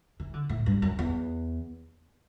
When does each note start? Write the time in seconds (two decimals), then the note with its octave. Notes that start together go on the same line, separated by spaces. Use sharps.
0.20 E3
0.34 D3
0.49 A2
0.66 G2
0.82 F#2
0.99 E2